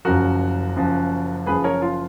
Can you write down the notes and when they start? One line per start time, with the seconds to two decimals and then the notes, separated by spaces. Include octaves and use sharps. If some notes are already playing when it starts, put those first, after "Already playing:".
0.05 F#1 F#2 F3 F#4 A#4
0.76 F#1 F#2 F3
1.46 F#1 F#2 F3 G#4 B4
1.64 A#4 C#5
1.82 F4